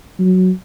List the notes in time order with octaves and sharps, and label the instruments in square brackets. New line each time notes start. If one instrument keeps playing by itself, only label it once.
[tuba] F#3